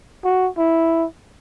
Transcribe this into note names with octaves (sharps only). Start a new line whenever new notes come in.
F#4
E4